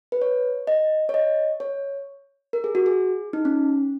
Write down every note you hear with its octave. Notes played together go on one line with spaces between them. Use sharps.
B4
C#5
D#5
C#5
D#5
C#5
A#4
G#4
F#4
G#4
D#4
C#4